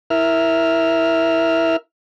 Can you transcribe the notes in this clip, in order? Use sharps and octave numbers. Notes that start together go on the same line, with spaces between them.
E4 A#4 E5 F6